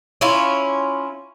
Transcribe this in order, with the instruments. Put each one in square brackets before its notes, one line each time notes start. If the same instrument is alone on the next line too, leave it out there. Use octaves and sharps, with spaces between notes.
[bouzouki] C#4 E4 F4